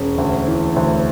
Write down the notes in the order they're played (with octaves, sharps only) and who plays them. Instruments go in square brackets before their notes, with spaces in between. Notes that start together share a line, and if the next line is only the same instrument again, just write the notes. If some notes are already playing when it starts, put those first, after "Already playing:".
Already playing: [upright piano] E1 [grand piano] C#4
[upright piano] D2
E3
D2